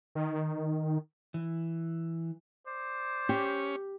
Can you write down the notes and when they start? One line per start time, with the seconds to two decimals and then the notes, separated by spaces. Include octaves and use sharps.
0.15 D#3
1.34 E3
2.67 C5 D5
3.29 C#4 G4